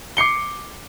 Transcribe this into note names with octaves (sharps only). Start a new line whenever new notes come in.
D6 C7 C#7 G7